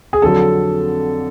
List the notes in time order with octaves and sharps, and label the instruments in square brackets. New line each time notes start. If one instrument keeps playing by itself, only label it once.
[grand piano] G#4
[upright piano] F2 D3 F#3 [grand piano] A4